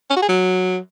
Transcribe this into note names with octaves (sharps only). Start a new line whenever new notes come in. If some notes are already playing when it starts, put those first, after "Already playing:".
C#4
F#4
G#4
F#3